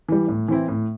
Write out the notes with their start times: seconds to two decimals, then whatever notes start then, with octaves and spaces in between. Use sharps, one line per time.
0.08 E3 G3
0.28 A2
0.48 E3 C4 E4
0.68 A2